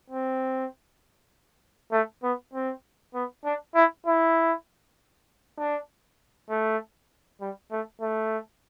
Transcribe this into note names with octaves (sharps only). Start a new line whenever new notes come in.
C4
A3
B3
C4
B3
D4
E4
E4
D4
A3
G3
A3
A3